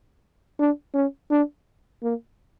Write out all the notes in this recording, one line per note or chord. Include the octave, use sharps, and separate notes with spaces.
D4
C#4
D4
A#3